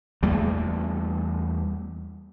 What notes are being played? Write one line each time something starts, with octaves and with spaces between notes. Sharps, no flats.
E2 G3 A3 A#3